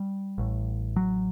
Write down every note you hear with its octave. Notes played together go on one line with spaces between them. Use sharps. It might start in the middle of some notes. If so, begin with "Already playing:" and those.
Already playing: G3
A1 A2
F#3